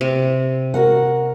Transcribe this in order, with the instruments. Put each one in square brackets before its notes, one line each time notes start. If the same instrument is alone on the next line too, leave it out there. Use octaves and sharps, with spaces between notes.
[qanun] C3
[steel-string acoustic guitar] F#4 A#4 F#5